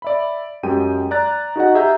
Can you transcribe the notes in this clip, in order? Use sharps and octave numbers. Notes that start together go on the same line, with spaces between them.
D5 E5 B5
F#2 G#3 G4 G5 D#7
D5 A#5 F#6 A6
D#4 F#4 G#4 D#5 F#5
G4 G#4 E5 A#5 G6